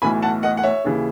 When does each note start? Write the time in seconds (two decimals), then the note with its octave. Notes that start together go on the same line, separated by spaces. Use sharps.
0.02 B1 A2 E3 G#5 B5
0.22 F#5 A5
0.43 D#5 F#5
0.57 F#5
0.63 C#5 E5
0.84 D#2 C#3 E3